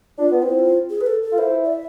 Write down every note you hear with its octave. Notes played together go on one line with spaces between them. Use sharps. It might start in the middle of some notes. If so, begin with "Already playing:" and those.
D4 F4
B3
C4 E4
F4
G#4
B4
A4
A4
F4
E4 C5
D5
E5